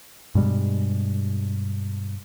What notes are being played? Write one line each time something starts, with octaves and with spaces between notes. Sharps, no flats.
G2 B2 G3 G#3